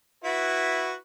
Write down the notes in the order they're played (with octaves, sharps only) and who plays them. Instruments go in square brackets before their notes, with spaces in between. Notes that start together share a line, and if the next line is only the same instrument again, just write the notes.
[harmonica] E4 F#4 B4